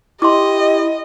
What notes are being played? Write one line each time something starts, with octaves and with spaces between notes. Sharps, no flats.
E4 G4 D#5 C6 D6